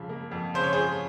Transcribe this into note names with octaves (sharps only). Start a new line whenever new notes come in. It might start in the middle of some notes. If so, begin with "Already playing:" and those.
Already playing: F2 C#3 F3
A#3
F2
C#3 C5
C#5
F3 G#4 C5